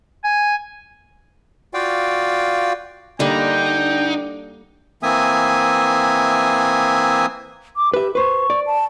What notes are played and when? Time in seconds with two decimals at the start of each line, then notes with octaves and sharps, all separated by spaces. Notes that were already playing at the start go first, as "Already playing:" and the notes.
0.24 G#5
1.74 F4 F#4 D5 F5 G5
3.20 D3 G3 A#3 D4 D#4 G5
5.03 E3 A#3 C4 E5 G#5 D#6
7.77 D6
7.94 G4 B4 E5
8.15 B4 C5 C#6
8.50 D5
8.67 A5